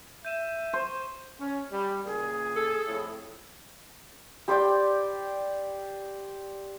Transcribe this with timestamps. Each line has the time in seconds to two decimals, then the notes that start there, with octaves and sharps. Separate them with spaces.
0.25 E5 G6 D#7 E7
0.73 C5 C#6
1.40 C#4
1.72 G3
2.05 C#2 A#2 G#4
2.56 A4
2.86 F2 A2
4.48 G4 C5 D5 G5